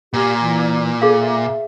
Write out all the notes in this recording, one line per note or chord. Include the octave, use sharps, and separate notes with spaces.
A#2 G4
E3
G#4 A4 F5
E5